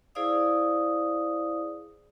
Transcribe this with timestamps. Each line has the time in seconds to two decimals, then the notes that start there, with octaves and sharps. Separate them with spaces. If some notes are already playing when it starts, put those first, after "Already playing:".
0.15 E4 G#4 C5 D5 F5 D#6